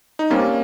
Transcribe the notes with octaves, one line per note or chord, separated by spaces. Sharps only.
D#4
G3 A#3 C4 C#4 G4